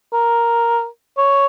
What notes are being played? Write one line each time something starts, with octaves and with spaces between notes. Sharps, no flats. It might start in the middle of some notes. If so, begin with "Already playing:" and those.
A#4
C#5